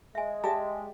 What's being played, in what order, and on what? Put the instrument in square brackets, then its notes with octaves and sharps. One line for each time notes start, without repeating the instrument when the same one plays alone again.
[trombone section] G#3 [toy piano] E5 G#5
[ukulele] G4 [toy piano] G#4 D5 E5 [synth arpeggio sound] A5